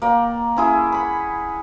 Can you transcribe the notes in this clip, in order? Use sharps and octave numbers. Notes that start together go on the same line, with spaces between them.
A#3 D5 G5
C#4 E4 G#4
F#5 B5